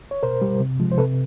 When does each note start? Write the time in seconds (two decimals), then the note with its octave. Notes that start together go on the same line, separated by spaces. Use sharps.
0.11 C#5
0.23 B2 A#4 C5
0.42 G3
0.60 C3
0.80 F3 G#3
0.92 C5
0.98 C3 A4 B4